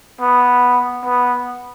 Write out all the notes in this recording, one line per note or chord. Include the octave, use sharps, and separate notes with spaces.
B3
B3